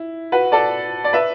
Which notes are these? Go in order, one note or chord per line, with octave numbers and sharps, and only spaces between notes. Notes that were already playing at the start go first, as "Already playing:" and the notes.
Already playing: E4
F#4 B4
A4 D5
D5
B4 E5